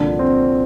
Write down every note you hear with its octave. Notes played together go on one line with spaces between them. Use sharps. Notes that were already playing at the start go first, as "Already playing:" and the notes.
Already playing: C2 A#2 D3 F3 D4
C4